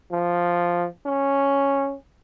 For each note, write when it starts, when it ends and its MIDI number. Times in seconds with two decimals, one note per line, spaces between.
0.12 0.87 53
1.06 1.95 61